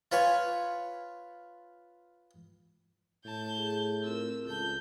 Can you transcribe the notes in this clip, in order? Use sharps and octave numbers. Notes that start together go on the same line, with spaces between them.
F4 B4 C#5 G#5
A2 A5 G6
G#4
C4 F4 A#4 E6
C#2 A4 A5 G6